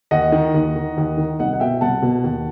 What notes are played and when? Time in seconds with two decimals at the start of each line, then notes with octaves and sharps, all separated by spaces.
0.11 D#2 D#5 F#5
0.32 D#3
0.54 D#2
0.76 D#3
0.97 D#2
1.17 D#3
1.39 C2 D#5 F#5
1.53 F#5
1.60 B2 E5 G5
1.81 C2 F#5 A5
2.02 B2
2.24 D#2